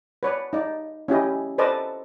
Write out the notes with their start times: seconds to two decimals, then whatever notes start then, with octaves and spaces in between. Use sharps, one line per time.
0.23 B4 C#5 D5
0.53 D#4 D5
1.08 C#4 E4 G4 D#5
1.58 A4 B4 C5 D5 D#5 A5